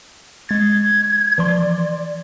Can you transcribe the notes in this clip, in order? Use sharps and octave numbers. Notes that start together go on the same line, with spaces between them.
G#3 G#6 A6
E3 F3 D5 C6